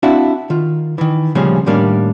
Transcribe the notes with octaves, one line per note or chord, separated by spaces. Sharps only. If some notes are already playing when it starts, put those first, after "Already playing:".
C4 D4 E4 F#4 E5 F5
D#3 F4
D#3 E3
D2 A#2 C#3 F3 G3 C#4
A2 D#3 G3 A#3 C#4 D4